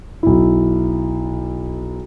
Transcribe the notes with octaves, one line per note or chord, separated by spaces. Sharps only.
B1 E4